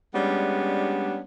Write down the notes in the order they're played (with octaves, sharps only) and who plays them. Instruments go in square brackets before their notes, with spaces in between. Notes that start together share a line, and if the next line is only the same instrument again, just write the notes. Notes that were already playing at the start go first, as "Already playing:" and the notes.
[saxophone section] G3 G#3 B3 C#4 D4